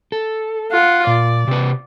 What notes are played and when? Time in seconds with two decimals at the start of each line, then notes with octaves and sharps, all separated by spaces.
0.12 A4
0.72 F4 F#5
1.07 A#2 D5
1.47 C3 B4